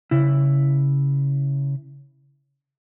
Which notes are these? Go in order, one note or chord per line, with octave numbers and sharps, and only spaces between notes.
C#3 E4